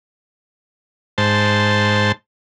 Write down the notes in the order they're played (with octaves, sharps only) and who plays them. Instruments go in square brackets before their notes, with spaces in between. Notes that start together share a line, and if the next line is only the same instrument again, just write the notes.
[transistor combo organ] G#2 C5 A5